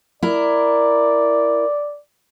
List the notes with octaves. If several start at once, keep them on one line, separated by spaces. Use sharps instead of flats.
E4 A#4 D5